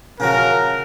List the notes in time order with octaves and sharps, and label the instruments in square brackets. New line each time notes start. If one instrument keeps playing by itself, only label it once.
[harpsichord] C#3 F3 F#4 [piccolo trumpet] A#4